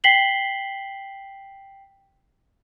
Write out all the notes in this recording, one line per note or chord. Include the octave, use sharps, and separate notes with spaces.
G5 B6 C7 F#7 G7